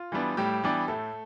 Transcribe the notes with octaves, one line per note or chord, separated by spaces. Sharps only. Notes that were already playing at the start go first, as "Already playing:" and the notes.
Already playing: F4
E3 G3 B3 D4
A2 G3 G4
E3 G3 B3 D4
A2 A3 A4